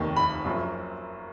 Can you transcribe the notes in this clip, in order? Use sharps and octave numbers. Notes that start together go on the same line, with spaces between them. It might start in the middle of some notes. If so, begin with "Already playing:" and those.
Already playing: F1 D#2 D#3
B5
F#1 F#2 F3